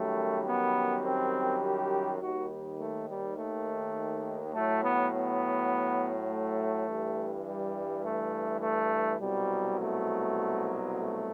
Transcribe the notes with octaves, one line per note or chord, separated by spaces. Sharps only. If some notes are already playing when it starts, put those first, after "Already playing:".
Already playing: F#2 D#3 G3 A3
B3
C4
G4
D#2 D#3 G3 F#4
A3
G3
A3
A2 F#3 A3
B3
B3
A3
G2 E3 G3
G3
A3
A3
C2 B2 F#3 G3
A3
A3